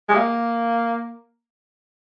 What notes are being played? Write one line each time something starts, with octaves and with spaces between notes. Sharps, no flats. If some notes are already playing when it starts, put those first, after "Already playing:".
G#3
A#3